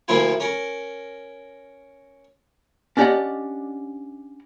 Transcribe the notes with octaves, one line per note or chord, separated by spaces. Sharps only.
D2 F3 A#3 E4 F4 G#5
C#4 A#4
C#4 D4 G4 D5 D#5 F#5